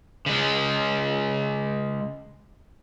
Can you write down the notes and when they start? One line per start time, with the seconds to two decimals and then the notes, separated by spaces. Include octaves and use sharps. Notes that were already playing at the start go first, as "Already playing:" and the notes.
0.26 C#3 G#3